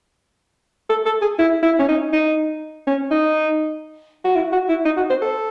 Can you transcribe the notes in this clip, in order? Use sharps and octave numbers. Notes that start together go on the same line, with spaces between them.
A4
A4
G#4
E4
E4
C#4
D#4
D#4
C#4
D#4
F#4
E4
F#4
E4
D#4
F#4
C5
A4